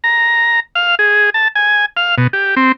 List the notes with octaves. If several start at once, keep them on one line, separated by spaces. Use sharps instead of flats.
A#5
F5
G#4
A5
G#5
F5
B2
G4
C4